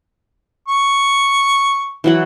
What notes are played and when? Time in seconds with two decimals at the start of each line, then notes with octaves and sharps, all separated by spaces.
0.68 C#6
2.04 E3 F#3 F#5